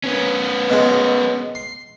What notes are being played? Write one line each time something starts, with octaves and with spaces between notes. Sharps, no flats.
B3 C#4
B2 G#3
C6